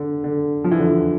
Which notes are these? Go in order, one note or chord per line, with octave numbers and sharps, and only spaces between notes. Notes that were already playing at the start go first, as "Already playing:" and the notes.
Already playing: D3
D3
F3
E3
D3
E3